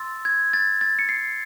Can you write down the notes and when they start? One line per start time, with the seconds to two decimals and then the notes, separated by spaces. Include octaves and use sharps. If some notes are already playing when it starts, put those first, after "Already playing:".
Already playing: C6 E6 A6
0.25 G#6
0.53 A6
0.81 A6
0.99 C#7
1.09 C7